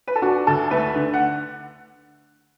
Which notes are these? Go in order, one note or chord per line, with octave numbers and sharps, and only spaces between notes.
B4
A4
D4 F#4
D2 A4
A3 B4
D3
F#5